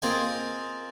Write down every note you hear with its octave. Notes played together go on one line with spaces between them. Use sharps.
A#3 C4 F4 G#4 D#5 G#5